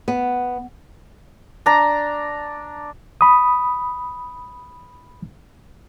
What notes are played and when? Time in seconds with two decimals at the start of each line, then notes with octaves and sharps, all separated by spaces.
0.08 B3
1.66 D4 A#5
3.21 B5 D#6